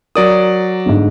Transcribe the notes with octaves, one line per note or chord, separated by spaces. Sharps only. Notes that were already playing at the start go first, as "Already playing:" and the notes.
F#3 A#4 D5 D#6
G1 G#2